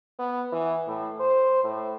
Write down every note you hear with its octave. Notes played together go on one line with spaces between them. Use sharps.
B3
E3
A2
C5
A2